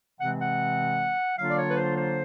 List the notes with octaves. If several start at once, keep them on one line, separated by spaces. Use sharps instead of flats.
C3 E3 G#3 C4 F#5
F#5
D3 F#3 A#3 D4 F4 F5
D5
C#5
B4
C5
C5